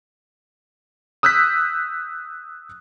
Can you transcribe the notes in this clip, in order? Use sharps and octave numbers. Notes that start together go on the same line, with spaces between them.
D#6 E6 F#6 G6 B6